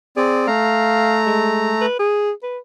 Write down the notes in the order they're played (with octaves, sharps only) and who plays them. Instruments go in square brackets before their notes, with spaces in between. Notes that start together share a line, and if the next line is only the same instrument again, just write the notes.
[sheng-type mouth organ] C4 D5 [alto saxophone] G#4
[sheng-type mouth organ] A3 A#5 [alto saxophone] F5
[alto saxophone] G#3
B4
G#4
B4